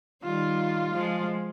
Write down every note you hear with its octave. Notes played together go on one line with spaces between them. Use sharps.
D#3 G3 F4
F3 G#3